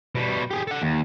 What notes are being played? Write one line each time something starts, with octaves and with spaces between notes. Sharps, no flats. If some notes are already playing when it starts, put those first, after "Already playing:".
B2 G3
G4 G#4
A4 F#5
D#2